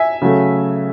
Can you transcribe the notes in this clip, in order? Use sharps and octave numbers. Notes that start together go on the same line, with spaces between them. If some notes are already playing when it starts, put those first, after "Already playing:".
Already playing: E5 G#5
C#3 F#3 A3